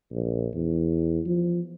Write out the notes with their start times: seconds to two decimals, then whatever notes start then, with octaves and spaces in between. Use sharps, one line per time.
0.11 A#1
0.54 E2
1.26 F3